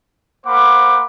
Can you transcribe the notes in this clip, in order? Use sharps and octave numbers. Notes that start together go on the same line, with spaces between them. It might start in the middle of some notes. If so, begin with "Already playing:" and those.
A#3 C5 F#5 B5 D6